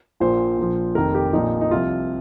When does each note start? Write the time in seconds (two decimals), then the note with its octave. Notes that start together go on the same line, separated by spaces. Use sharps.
0.20 A#1 A#2 F3 C5
0.58 A#1 A#2 F3
0.95 F1 F2 D#3 A#4
1.15 G4
1.33 A#1 A#2 F3 D#4
1.61 D#4
1.71 C2 C3 F3 F4